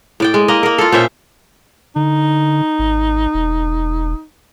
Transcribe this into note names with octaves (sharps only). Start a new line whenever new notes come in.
A2 D5 G5
G#3
A#3 D#5
A#3 A#4
F4 A4
A#2 C#4 C5 E5
D3 D#4
G#1
E1